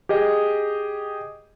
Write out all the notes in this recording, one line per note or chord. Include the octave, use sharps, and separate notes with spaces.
G4 G#4 D#5